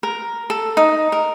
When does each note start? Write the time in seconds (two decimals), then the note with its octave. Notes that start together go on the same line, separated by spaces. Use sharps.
0.03 A#4
0.50 A4
0.77 D#4
1.12 A#4